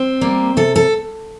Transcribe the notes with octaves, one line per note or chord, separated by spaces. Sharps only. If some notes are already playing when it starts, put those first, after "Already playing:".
Already playing: C4
G3 A#3
C3 A4
A4